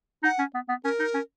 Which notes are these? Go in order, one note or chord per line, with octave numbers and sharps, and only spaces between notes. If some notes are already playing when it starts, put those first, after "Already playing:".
D#4 F#5
C#4
B3
B3
C#4 A#4
D#4
C#4